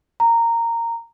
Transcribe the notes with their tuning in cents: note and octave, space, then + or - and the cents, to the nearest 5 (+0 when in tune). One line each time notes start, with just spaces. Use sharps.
A#5 -10